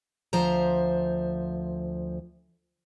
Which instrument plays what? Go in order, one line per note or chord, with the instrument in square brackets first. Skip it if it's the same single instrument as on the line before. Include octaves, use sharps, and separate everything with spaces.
[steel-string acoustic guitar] D2 F3 C5 E5 A#5